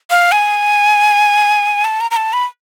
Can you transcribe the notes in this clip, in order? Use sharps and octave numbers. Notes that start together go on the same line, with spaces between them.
F5
G#5
A5
A#5
A#5
A5
B5